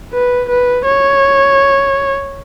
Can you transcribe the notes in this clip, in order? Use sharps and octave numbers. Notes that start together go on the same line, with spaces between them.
B4
B4
C#5